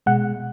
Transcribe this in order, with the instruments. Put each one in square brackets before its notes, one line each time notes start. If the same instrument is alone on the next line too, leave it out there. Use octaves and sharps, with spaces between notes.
[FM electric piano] B2 G#3 F#5